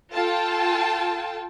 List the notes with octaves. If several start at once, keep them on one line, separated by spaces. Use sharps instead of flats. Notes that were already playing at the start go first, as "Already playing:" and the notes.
F4 A4 G5 A5